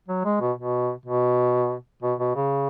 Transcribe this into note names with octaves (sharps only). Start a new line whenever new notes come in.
F#3
G#3
B2
B2
B2
B2
B2
C#3